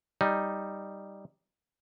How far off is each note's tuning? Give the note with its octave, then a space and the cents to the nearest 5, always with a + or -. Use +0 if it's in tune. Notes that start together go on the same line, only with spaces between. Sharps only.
G3 +0 D#4 +0